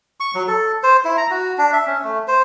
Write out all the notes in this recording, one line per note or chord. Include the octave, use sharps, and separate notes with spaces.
C#6
F#3
A4
C5
E4
A#5
F#4
D4
E5
C#4
A3
C5